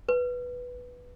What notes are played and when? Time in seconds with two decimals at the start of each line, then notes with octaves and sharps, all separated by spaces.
0.09 B4